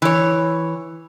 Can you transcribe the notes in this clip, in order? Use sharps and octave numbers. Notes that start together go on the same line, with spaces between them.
E3 C#5